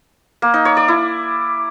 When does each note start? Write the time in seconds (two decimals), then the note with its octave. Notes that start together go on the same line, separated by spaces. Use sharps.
0.42 A#3
0.54 D#4
0.65 C#5
0.77 D5
0.88 E4